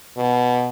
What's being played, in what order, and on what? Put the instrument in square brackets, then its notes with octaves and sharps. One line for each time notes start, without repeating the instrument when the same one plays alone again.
[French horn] B2